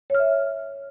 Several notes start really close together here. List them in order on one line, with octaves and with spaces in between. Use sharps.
C#5 F6 E5